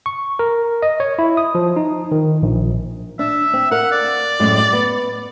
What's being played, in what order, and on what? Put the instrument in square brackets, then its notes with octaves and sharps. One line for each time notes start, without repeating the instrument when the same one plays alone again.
[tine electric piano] C#6
A#4
D#5
C#5
E4
D#6
F3
D#4
D#3
A#1
[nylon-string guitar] D4 [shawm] E5
[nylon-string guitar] C4
[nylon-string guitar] A#4 F5 [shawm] F#5
[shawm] D5
[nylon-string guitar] F#2 A2 G#3
B3